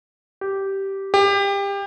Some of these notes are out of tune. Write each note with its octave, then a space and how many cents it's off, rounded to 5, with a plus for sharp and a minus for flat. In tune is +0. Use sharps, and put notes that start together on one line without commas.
G4 -10
G4 +25